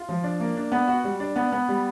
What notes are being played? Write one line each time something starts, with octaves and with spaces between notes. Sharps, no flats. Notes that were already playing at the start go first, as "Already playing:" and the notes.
Already playing: F4
F3
D4
A#3
D4
B3
F#4
G3
D4
B3
B3
G3